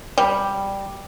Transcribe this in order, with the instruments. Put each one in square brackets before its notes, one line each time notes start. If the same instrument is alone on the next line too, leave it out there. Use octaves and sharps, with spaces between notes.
[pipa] G3